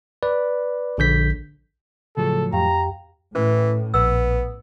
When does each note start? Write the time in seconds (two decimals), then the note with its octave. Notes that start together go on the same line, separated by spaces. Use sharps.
0.23 B4 D5
0.98 A#1 D3 G6 B6
2.17 A2 C#3 F3 F#3 G#4 A4
2.53 F2 G4 F5 G5 A#5
3.35 A2 E3 C#4
3.94 A#1 B3 B4 E6